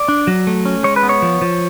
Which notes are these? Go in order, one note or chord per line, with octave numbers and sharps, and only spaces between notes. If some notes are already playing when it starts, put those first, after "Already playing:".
Already playing: D5
D4
F#3
A3
C#4
G#3 C#5
B4
B3
C#5
F3
F3